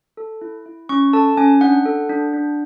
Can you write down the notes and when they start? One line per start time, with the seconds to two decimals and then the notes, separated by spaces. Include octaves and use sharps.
0.17 A4
0.41 E4
0.66 E4
0.89 C#4 C#6
1.13 A4 A5
1.37 C#4 G#5
1.61 D4 F#5
1.86 A4
2.09 D4
2.33 D4